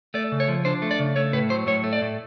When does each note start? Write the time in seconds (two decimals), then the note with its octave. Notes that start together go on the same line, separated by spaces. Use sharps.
0.14 A3 D5
0.32 C#3
0.40 C#5
0.48 F3
0.65 D4 C5
0.82 A3
0.91 D5
0.99 C#3
1.16 A3 C#5
1.33 A2 B4
1.50 F#3 C5
1.67 A2 C#5
1.84 A3
1.93 D5
2.02 A2